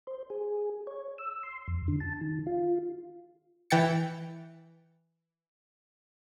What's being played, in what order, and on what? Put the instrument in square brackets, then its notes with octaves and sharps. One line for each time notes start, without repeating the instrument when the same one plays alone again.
[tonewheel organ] C5
G#4
C#5
E6
C6
F2
D3
A5
D#3
F4
[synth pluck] E3 G5 A6 C#7